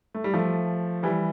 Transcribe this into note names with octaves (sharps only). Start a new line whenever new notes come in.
A3
G3
F3 A3
E3 G3